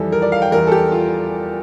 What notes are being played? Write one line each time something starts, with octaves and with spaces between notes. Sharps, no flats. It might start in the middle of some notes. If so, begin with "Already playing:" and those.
Already playing: F2 E3 G3 A4
A#4
D5
F5
G5
E2 E3 G3 A#4
A4
G4
F4